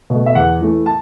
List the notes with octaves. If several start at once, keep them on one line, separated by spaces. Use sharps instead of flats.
B2 A3
E5
E2 F#5
E3 A3
A5